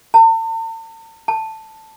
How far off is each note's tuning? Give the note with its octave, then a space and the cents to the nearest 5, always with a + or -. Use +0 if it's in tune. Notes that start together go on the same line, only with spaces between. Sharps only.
A5 +45
A5 +5